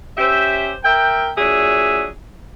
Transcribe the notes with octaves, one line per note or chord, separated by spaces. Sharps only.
C#4 G4 C5 E5
A#4 E5 G5
A#2 F#3 D4 G#4 E5